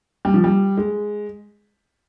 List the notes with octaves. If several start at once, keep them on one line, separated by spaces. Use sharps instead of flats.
G3
F3
G3
G#3